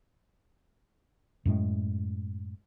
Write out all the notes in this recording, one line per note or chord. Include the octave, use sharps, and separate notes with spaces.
F#2 A2 G#3